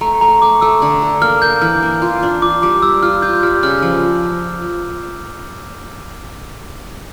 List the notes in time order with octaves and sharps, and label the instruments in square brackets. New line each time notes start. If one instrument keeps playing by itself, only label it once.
[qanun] A3 [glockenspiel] A#5
[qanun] A3 [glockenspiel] A#5
[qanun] A3 [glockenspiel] D6
[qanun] A3 [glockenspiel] E6
[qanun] D3
A4
[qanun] A#3 [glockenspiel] F6
[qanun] A#3 [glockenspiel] G6
[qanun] E3 [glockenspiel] F6
[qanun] A#3
F4
D4
[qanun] F4 [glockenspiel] D6
[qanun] G3 [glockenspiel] D6
[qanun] G3 [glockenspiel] E6
[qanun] F4 [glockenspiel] F6
[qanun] F4 [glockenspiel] G6
[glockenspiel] G6
[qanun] G3 [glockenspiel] F6
[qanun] C#3 [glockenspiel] F6
[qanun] F3